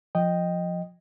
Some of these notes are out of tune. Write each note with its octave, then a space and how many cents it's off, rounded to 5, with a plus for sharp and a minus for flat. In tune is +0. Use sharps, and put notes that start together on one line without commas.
F3 +5 D#5 -5 G5 +0